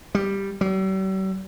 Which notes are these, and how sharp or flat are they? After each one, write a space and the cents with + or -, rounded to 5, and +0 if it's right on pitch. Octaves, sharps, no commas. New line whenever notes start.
G3 +5
G3 -45